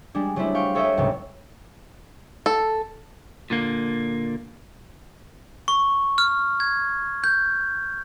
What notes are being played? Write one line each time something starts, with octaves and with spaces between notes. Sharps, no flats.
G3 G#3 D4
F#3 G3 A3 C4 E4
F5 G5 C#6
A4 C#5 D#5 E5 G5
C#2 G#2 C3 F#3 B3
A4
A#2 D3 A#3
C#6
F6
G#6
G6